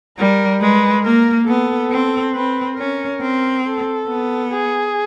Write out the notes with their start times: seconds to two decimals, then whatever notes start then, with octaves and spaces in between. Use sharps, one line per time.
0.19 G3 A#4
0.61 G#3 B4
1.05 A#3 A#4
1.48 B3 A4
1.92 C4
2.35 C4 B4
2.78 C#4 A#4
3.22 C4
3.65 A4
4.08 B3
4.51 G#4